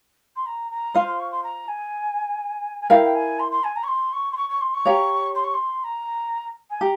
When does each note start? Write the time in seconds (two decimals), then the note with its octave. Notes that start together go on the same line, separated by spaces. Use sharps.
0.36 C6
0.46 A#5
0.71 A#5
0.94 F4 C5 F5 C6
1.07 C6
1.19 C#6
1.31 C6
1.43 A#5
1.68 G#5
2.80 G#5
2.90 E4 A#4 F5 G5
3.04 G5
3.14 G#5
3.39 C6
3.51 C6
3.63 G#5
3.75 A#5
3.83 C#6
3.88 C6
4.12 C#6
4.31 C6
4.36 C#6
4.49 C#6
4.61 C6
4.74 C#6
4.85 G4 C#5 F5 A#5
5.35 C6
5.43 C#6
5.53 C6
5.83 A#5
6.70 G#5
6.80 G4 A#5